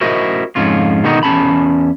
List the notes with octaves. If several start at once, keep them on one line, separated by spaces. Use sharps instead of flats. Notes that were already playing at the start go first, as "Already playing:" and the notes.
E4 F#4 A#4 C5 D#5
F2 G#2 C#4 F4
B2 D3 D#3 G#3 D#4 F#4
E2 C#4 A5 B5